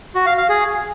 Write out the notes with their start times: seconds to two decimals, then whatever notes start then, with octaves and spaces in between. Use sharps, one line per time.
0.15 F#4
0.26 F5
0.38 F5
0.49 G#4